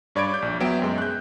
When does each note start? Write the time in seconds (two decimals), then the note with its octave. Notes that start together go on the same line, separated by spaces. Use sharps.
0.15 G2 C#5 D5 B5 G#6 D7
0.30 D6 G6
0.42 A#1
0.60 F#3 B3 E5 G5 D7
0.82 F#2 G#3
0.98 F#6 G6